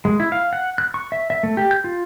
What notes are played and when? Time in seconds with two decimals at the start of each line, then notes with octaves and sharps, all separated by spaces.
0.05 G#3
0.20 E4
0.32 F5
0.53 F#5
0.78 F#6
0.94 C#6
1.12 E5
1.30 E5
1.43 A3
1.57 G4
1.71 G6
1.84 F4